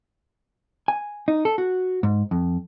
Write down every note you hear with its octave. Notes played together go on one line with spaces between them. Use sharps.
G#5
D#4
A4
F#4
G#2
F2